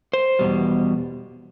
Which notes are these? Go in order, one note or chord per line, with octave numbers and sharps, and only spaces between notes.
C5
E2 B2 G3